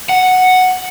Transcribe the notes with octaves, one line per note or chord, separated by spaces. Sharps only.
F#5